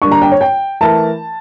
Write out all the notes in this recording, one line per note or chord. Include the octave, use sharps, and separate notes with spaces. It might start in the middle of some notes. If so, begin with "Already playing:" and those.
D3 G3 A#3 D4 C#6
A#5
G5
C#5
G5
E3 A3 E4 A#4 A5